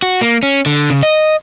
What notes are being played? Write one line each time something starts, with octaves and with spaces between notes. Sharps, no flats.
F#4
A#3
C#4
D3
C#3
D#5